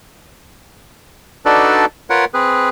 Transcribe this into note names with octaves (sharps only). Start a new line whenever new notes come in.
D4 D#4 F#4 A4 B4 D5
F4 A#4 B4 C#5 F#5
C4 G#4 B4